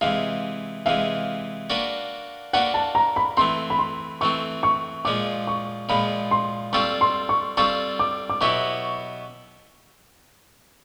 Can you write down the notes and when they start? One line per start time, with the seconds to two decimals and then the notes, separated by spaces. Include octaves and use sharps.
0.01 C3 E3 G#3 F5
0.86 C3 E3 G#3 F5
1.70 A#3 D4 F#4 B4
2.53 A#3 D4 F#4 B4 F#5
2.74 A5
2.95 A#5
3.16 B5
3.37 E3 A3 C4 C6
3.70 B5
3.79 C6
4.21 E3 A3 C4 C#6
4.63 C#6
5.05 A#2 F3 G#3 D6
5.47 C#6
5.89 A#2 F3 G#3 B5
6.31 C6
6.73 G3 C4 F4 A4 C#6
7.01 C6
7.29 C#6
7.57 G3 C4 F4 A4 C#6
7.99 D6
8.30 D6
8.41 B2 F#3 B3 E4 G4 C#6